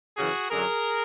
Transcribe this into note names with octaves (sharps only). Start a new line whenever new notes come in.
F#2 C#3 E3 F#4 G#4
F#2 D3 F#3 G#4 A#4